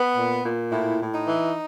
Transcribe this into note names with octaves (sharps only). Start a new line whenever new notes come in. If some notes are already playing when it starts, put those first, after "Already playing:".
Already playing: B3
A#2
A#2
A2 E4
A2
D#4
E3